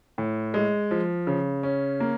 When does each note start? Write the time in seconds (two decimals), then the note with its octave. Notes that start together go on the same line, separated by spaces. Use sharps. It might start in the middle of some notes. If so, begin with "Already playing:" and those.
0.18 A2
0.54 G#3
0.91 F3
1.27 C#3
1.63 C#4
2.00 A#3